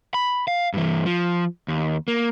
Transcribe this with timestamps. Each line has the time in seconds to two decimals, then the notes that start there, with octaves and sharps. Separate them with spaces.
0.14 B5
0.48 F5
0.74 G2 E3
1.06 F3
1.68 D#2
2.08 A#3